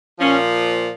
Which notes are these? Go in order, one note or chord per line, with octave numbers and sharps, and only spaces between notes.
A#2 F3 C#4